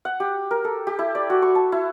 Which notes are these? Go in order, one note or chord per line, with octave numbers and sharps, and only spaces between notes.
F#5
G4
A#4
A4
G4
E4
D5
F#4
C#6
A5
E4